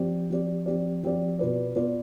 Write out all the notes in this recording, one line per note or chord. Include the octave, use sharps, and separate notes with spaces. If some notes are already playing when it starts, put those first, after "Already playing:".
Already playing: F3 C4 G4 D5
F3 C4 G4 D5
F3 C4 G4 D5
F3 C4 G4 D5
B2 B3 F4 B4 D5
B2 B3 F4 B4 D5